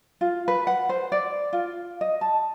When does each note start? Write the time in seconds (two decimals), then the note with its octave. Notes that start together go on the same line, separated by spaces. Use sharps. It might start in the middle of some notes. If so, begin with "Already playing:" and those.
0.21 F4
0.48 B4
0.67 F#5
0.89 C5
1.12 D5
1.53 F4
2.01 D#5
2.21 A5